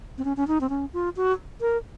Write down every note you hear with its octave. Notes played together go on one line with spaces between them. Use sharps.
C4
C#4
C#4
D#4
C4
C#4
F4
F#4
A#4